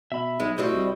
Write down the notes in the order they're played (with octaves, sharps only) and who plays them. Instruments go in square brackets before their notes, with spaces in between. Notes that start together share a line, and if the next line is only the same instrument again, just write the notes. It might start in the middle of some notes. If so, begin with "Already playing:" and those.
[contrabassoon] B2 [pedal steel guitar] E5 B5
[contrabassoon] B1 [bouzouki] G#3
[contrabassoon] A2 [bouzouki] G3 C4 E4 [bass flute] F#4 [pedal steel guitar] C5 D#5 E6
[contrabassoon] C2